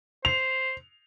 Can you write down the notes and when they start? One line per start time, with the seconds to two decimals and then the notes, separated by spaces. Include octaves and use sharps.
0.25 C5 F7